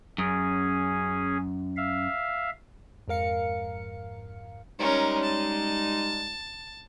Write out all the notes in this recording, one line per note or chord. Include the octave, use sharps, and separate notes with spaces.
F#2 C#4 G#4
E5 F5
F2 G#2 A#4 F5 C#7
G3 G#3 C#4 D#4 A#4
A5